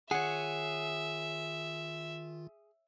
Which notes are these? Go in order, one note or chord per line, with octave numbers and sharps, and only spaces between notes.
D#3 F4 G#4 C#5 E5 F#5